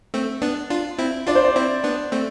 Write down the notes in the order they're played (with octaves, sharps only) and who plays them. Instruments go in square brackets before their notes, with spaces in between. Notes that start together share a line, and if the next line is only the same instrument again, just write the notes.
[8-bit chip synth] A3 C4
B3 D4
D4 F4
C4 E4
[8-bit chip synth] D4 F4 [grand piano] D5
[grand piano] C5
D5
[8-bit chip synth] C4 E4
B3 D4
A3 C4